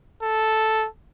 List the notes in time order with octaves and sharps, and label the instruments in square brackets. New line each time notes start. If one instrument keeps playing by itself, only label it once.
[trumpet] A4